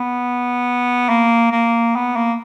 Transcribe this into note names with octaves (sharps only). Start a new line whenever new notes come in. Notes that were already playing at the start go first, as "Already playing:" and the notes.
Already playing: B3
A#3
A#3
B3
A#3